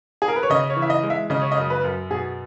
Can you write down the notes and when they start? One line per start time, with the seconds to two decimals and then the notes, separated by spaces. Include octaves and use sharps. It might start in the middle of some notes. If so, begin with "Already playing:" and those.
0.22 G#4
0.28 A#4
0.36 B4
0.43 C#5
0.50 C#3 D#5
0.70 C#5
0.77 E3
0.82 E5
0.90 D#5
1.03 G#3
1.10 E5
1.30 C#3 D#5
1.41 C#5
1.52 D#5
1.57 F#2
1.70 B4
1.84 F#2
2.11 B2 G#4